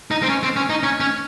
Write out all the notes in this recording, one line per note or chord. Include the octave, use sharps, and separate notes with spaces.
D#4
C4
C#4
C4
C#4
D#4
C#4
C#4